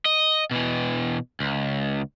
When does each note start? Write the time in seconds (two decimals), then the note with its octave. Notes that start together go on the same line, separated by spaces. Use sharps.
0.06 D#5
0.51 B2 E3
1.40 C#2